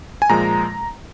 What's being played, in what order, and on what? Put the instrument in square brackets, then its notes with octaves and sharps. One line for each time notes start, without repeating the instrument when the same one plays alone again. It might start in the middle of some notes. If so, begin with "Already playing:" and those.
[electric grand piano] G#5
A#2 F3 G#3 A#5